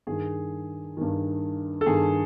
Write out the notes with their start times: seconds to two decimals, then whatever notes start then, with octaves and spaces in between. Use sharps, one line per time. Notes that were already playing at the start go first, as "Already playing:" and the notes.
0.07 G2 D#3 G#4
0.97 G2 D#3
1.81 A4
1.86 G2 D#3 G#4